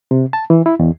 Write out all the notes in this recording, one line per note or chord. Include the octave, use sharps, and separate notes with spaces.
C3
A5
E3
E4
E2